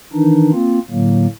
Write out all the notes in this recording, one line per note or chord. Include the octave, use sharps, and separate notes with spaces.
D#3 E3 D4 D#4
A#3 C4 F4
A2 D3 F#3 A#3